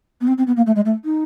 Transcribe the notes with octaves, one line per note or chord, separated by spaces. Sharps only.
B3
C4
C4
B3
A#3
A3
G#3
A3
D#4